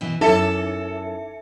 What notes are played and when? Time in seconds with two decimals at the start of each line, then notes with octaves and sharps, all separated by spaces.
0.01 B2 E3
0.21 F#2 D#4 E4 A4 E5 C#7